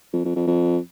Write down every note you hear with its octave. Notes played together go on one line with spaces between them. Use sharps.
F2
F2
F2
F2